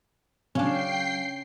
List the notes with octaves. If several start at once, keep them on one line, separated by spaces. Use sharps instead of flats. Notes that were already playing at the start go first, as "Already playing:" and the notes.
C#3 F#3 C#4 D4 F5 G5 C7